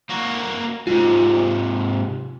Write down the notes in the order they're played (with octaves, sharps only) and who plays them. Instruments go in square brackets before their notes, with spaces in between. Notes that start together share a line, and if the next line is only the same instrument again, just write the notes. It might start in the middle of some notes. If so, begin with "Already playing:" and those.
[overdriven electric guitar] A#3 F#4
[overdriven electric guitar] G#2 C3 [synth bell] F4